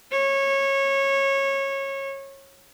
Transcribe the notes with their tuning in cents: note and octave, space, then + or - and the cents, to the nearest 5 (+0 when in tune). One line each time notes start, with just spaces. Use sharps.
C#5 -20